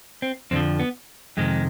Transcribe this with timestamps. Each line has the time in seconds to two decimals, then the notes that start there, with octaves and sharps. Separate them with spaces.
0.22 C4
0.51 F2 D3 F3 C4
0.80 B3
1.37 F2 C3 D#3 G#3